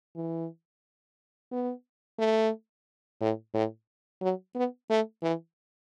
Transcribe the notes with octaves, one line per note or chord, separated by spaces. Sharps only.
E3
B3
A3
A2
A2
F#3
B3
A3
E3